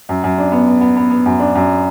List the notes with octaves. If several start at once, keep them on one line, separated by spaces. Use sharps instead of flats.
F#2
F#2
D4
B3
B3
B3
B3
B3
F#2
D4
F#2